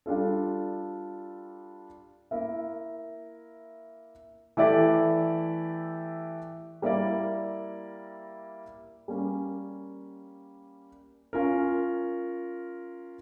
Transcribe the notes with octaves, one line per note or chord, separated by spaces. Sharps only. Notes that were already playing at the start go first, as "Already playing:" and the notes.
G3 D4 F4 A4
A#3 E4 A#4 E5
E3 A3 E4 G4 D5
G3 A#3 E4 A#4 D5
G3 A#3 C#4
C#4 F4 A#4